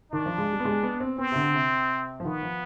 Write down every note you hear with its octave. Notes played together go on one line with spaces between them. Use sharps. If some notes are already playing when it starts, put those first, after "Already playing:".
D#3 D4
F3
G#3
G3
B3
G#3
B3
C4
B3 C4
C3
D3
C3
F3
D#3 B3
F3